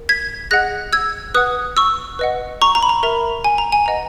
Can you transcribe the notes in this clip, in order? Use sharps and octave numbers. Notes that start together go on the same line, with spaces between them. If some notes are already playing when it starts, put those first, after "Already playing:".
Already playing: A#4
G#6 B6
G#4 D#5 F#5 F#6 A#6
E6 G#6
B4 F#5 D#6 F#6
C#6 E6
B4 D#5 F#5
A#5 C#6
A#5
B5
A#5
A#4 E5 A#5
G#5
A#5
G#5
B4 D#5 F#5 A#5